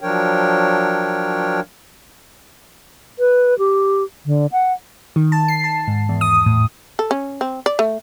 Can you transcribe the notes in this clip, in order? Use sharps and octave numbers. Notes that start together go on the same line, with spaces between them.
F3 F#3 D4 A#4 C#5 G5
B4
G4
D3
F#5
D#3
A5
C7
A5
G#2
E2
D#6
A2
A4
C#4
C4
D5
A3